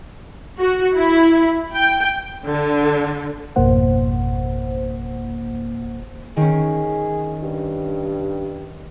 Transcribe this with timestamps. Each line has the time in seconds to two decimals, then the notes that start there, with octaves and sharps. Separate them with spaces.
0.59 F#4
0.94 E4
1.74 G5
2.47 D3
3.56 G#1 F2 B2 A#3 C5 F#5
6.37 D#3 C#4 G#4
7.43 G2